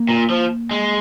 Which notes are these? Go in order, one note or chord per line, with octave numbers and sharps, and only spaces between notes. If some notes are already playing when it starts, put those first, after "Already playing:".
Already playing: A#3
A#2
F3
G#3